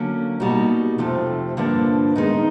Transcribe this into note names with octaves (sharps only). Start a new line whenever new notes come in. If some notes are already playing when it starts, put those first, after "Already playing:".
Already playing: D3 F#3 A#3 C#4
B2 G3 A#3 D#4 F#4
F2 C3 F3 A3
G2 D3 F3 A#3 D4
D#3 G#3 B3 D#4